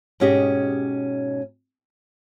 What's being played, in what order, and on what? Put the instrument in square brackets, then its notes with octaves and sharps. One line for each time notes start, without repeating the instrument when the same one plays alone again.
[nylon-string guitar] G#2 B2 C#4 G4 G#4 D#5